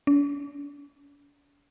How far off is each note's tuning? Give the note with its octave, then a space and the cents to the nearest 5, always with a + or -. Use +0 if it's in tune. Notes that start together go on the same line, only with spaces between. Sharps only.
D4 -45